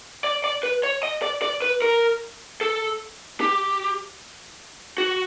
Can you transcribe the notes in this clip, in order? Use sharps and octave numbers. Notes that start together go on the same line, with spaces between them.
D5
D5
B4
C#5
D#5
D5
D5
B4
A#4
A4
G4
F#4